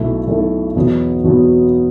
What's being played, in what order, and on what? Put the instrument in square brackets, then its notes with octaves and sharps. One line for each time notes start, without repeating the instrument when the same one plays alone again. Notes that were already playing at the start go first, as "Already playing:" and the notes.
Already playing: [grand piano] B1 B2 A3 E4 A4
B1 B2 A3 E4 A4
E2 B2 F#3 B3
E2 B2 F#3 B3